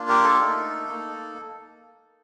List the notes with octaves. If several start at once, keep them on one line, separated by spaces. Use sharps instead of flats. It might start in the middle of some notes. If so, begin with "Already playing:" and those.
Already playing: A#3 D4 F4
G4 A#4
A4
A3 D#4
A#3 D#4